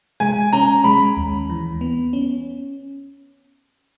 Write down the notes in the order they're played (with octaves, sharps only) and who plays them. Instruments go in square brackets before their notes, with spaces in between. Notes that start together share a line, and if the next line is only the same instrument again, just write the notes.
[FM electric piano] G#3 [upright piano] G#5
[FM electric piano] C#4 [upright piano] A#5
[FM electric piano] G#3 [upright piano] B5
[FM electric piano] D#2
E3
B3
C#4